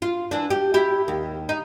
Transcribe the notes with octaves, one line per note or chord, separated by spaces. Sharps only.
F4
E3 D4
G4
E4 G4
D#2
D#4